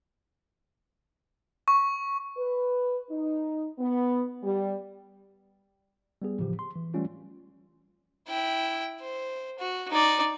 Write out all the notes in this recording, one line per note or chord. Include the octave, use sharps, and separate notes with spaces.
C#6
B4
D#4
B3
G3
G3 B3 G#4
A2 C#3 E3 F3 G4
C6
E3
E3 G3 A3 C#4 F4
E4 G5
C5
F#4
D#4 D5